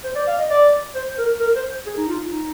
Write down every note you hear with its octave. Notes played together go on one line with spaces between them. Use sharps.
C5
D5
F5
D#5
D5
C5
A#4
A#4
C5
G#4
D#4
F4
D#4